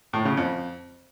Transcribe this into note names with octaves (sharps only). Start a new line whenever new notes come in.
A2
C#3
F2